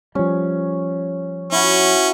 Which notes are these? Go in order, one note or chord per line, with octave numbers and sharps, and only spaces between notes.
F3 G3 C#4
C#4 E4 F#4